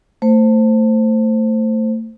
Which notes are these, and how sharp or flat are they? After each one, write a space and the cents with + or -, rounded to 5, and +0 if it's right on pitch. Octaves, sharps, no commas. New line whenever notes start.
A3 +25 C5 +0